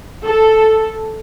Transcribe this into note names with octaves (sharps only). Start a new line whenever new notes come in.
A4